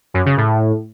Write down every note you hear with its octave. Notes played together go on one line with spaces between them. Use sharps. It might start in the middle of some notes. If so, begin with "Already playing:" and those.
F#2
C#3
A2